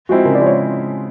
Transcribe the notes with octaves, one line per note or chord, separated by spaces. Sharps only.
F3 G#3 C4 E4 F#4
C#3 A#4
D5
F3 G#3 C4 E4
C#5